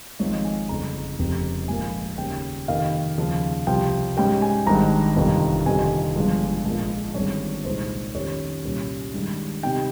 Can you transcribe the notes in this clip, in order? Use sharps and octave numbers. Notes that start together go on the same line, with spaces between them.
G#1 G#2 F3 C4 D#4 C#5
D#5
G#5
G1 F2 C#3 A#5
F1 F2 C#3 G3 C4
A#1 G#2 F3 A#3 G#5
D#2 C#3 G3 C#4 G5
F2 C3 D#3 A#3 F5
D#2 C#3 F3
C2 C3 F3 G5
G#2 G3 C#4 G5
G#5
G#1 G2 D#3 G#3 A#5
G1 F2 C3 D#3 G3
G1 F2 C3 D#3 G#5
G1 G2 F3 G#3
A#1 G#2 F3 A#3
G1 G2 D#3 G#3 C4 C#5
C2 A#2 G#3 D#4 C5
F2 D#3 G3 A#3 C#4 C#5
C2 A#2 G3 C#4
G2 D#3 G#3
C3 G3 C4 D#4 G5